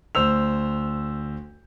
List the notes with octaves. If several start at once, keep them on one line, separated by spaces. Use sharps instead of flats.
D2 C5 E6 F7